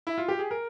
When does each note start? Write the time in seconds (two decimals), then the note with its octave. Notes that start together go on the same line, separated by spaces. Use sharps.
0.07 E4
0.18 F4
0.28 G4
0.39 G#4
0.51 A#4